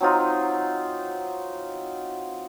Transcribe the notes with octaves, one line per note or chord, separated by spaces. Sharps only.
F#3 C4 D#4 F4